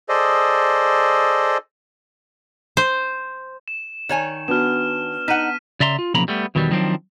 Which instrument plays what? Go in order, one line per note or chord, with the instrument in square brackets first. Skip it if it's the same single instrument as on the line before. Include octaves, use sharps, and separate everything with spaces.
[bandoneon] G#4 A4 C5 D5 D#5
[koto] C5
[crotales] E7
[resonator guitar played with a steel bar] D#3 C#5 G#5
[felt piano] B3 D4 F#4 [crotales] F6 E7
[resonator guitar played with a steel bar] D#4 F#5 [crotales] B6 D#7
[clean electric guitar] C#3 D5 E5 A#5 C6
F4
B1 C#3 F3 A#3 A#5 B5
G3 A3 B3
E2 B2 D#3 F#3 G3
D#3 F3 F#3 C4 D4